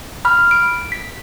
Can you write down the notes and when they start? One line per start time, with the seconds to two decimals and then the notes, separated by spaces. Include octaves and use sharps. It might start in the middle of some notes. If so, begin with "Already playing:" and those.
0.25 B5 F6
0.51 D7
0.92 B6